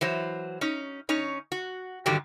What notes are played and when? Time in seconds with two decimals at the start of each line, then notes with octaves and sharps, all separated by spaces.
0.01 E3 F#3 C5
0.61 C#4 D#4
1.09 C#4 D#4 C#5
1.52 F#4
2.06 G2 D3 D#3 F#3 F#4 G4